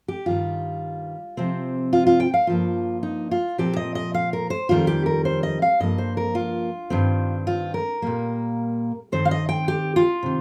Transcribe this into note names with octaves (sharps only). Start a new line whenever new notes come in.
G4
G2 D#3 G3 F4
C3 F3 C4
F4
F4
G5
F5
G2 F3 A#3 F4
D#4
F4
A#2 F3 C4 G4
D#5
D#5
F5
A#4
C5
F2 D#3 G3 A#3 F4
G4
A#4
C5
D#5
F5
G2 F3 A#3 D#5
C5
A#4
F4
G2 D#3 C4
F4
A#4
A#2 G3 A#3
G2 D#3 C4 C5
F5
D#5
G5
G4
F4
C3 D#3